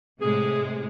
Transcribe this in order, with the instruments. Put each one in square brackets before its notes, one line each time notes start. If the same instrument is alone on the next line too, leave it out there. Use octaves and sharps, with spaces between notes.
[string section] A2 C3 G#3 [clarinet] G#4